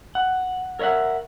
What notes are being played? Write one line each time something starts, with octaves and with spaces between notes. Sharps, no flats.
F#5
A#4 C#5 D#5 E5 F#5